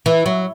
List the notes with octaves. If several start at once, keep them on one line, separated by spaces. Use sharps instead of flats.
E3
F#3